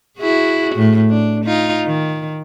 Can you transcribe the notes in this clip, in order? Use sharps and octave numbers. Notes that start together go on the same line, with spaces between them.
E4 F#4 G#4
A2
D4
D#4 F4
D#3